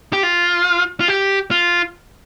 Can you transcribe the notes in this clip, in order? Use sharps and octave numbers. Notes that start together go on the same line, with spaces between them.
G4
F4
F4
G4
F4